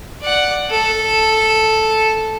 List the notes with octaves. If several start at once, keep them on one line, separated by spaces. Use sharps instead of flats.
D5 F#5
A4